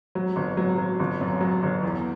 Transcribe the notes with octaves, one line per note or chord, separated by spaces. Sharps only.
F#3
G1
F#3
F#3
G1
F#2
F#3
G1
E2